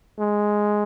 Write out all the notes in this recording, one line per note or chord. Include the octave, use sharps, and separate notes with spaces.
G#3